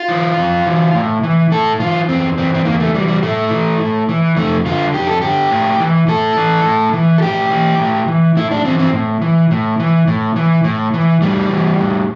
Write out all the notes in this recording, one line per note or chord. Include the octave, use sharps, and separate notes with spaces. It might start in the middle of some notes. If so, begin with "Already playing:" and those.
Already playing: F4
E3
F2
E3
A2
E3
A2 A4
E3 F4
E2 C4
E3 C4
C4
E2 A#3
A3
E3 G3
G3
A2 A3
E3
A2
E3
F2 A3
D3 F4
F2 G4
A4
D3 G4
A2
E3
A2 A4
E3
A2
E3
A4
A2 G4
E3
A2
E3
A2 E4
D4
E3 C4
C4
A2
E3
A2
E3
A2
E3
A2
E3
A2 G3
E3
A2